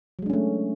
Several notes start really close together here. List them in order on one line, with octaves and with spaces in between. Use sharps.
F#3 G#3 D4 C#4 A3